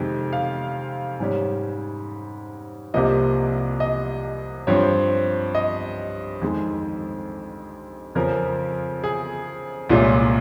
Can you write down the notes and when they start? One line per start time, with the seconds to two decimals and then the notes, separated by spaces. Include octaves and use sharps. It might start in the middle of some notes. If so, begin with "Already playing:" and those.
Already playing: F2 C3 D#3 G#3
0.33 F5
1.20 G#2 G3 C#4
2.94 C2 C3 F3 A#3 D#5
3.80 D#5
4.67 G2 F3 C4 C#5
5.55 D#5
6.42 F2 D#3 G#3
8.15 F2 C#3 F3 A#4
9.04 G#4
9.89 C2 A#2 G#3 C#4 F4